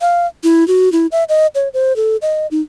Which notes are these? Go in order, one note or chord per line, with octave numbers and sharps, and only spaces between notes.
F5
E4
F#4
E4
E5
D#5
C#5
C5
A4
D#5
D#4